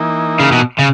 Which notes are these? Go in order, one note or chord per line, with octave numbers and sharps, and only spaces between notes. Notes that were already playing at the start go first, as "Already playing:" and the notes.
Already playing: E3 A#3 D#4
C#3
B2
C#3